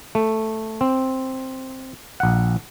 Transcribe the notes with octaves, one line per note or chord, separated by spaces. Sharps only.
A3
C4
A#1 F#5